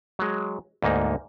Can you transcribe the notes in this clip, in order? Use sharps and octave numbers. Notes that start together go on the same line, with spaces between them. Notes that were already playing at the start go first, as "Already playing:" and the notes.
F#3 G#3
D2 G#2 A#3 D#4